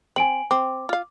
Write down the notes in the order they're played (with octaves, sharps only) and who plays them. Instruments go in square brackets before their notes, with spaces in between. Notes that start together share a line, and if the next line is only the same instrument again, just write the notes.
[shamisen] C4 [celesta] G#5 D7 F#7
[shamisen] C4 [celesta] D6
[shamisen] F4 F5